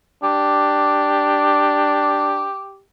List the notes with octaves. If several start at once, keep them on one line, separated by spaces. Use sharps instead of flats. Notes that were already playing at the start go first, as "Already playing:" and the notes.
D4 G4